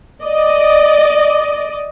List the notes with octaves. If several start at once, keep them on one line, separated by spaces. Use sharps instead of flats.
D5 D#5